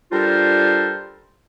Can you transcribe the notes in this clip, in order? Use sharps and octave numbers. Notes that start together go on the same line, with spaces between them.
G3 D4 F4 A4 A#4 C5